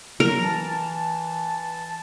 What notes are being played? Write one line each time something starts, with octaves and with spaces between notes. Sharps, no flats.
F#3 A#4
E3 A5